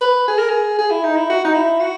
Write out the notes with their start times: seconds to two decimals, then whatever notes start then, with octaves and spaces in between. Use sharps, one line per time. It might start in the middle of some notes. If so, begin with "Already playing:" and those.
0.01 B4
0.28 G#4
0.38 A#4
0.49 G#4
0.78 G#4
0.90 E4
1.03 D#4
1.16 E4
1.30 F#4
1.45 D#4
1.54 E4
1.80 F#4